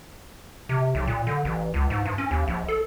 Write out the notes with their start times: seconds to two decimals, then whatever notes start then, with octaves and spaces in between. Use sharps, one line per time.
0.69 C3
0.95 B1
1.07 A#2
1.27 D3
1.45 A1
1.74 C#2
1.90 G#2
2.06 G2
2.18 C#4
2.31 D#2
2.48 A#1
2.68 A4